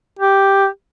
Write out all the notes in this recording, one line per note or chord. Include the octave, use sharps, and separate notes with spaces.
G4